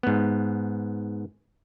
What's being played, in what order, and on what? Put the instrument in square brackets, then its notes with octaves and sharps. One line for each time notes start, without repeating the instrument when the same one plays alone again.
[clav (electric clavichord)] G#2 B3